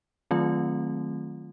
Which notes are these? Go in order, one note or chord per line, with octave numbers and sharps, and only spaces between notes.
D#3 F#3 A3 C4 F4